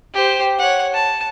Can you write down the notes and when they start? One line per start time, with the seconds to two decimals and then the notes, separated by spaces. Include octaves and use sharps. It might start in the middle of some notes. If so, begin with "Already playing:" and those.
0.14 G4 C5
0.58 C#5 F#5
0.94 A5